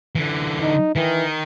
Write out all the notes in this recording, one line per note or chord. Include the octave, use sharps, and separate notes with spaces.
D3 E3
D#4
D#3 E3